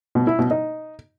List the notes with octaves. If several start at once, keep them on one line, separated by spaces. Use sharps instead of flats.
B2
E4
B2
D#4